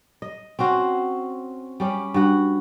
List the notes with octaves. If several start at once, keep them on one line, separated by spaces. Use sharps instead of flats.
D#5
C4 C#4 F#4 C5
G3 C#4 G4
G2 F#4 F#5